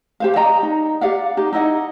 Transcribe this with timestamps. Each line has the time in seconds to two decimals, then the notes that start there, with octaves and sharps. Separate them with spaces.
0.20 G4 C5 F5
0.36 D5 D#5 G5 A#5
0.63 D#4
1.01 G4 D5 F5 F#5
1.37 D#4 G4
1.53 D#4 E4 D#5 F#5